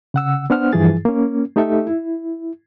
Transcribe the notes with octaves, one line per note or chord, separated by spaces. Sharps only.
C#3 F#5 E6
B3 D4 C5 F#5 F6
G2 E3 F3 E4 G#4 A6
A#3 C#4
A3 D#4 G4 A4 E5
E4